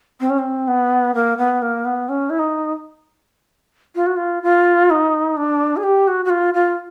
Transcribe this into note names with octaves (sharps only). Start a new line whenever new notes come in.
C4
C#4
C4
B3
A#3
B3
A#3
B3
C#4
E4
D#4
F4
F#4
F4
F4
D#4
D4
G#4
G4
F#4
F#4
F4
F4